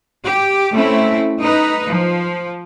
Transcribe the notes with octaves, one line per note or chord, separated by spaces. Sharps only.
G4
A3 C4 C#4 E4
D#4 B4
F3